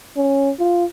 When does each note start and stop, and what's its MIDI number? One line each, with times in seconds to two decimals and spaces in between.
0.16 0.50 61
0.59 0.85 65